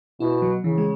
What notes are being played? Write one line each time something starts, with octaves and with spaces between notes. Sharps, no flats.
B2 E4
F#3
C#3 E3
G#3